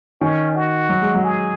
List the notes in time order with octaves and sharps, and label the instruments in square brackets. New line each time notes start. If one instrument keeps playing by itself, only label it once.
[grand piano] D#3 [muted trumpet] C#4
[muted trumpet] F#4
[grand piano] F#3
G#3
F#3
[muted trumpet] G#4